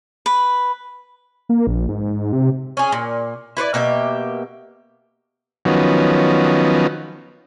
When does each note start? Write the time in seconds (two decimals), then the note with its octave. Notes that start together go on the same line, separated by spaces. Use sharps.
0.26 B4
1.49 A#3
1.67 A#1
1.89 G#2
2.33 C3
2.77 C#4 G#4
2.92 A#2
3.57 E4 B4 C5 D5
3.74 B2 A#3 G4 E5
5.65 D#3 F3 F#3 B3 C#4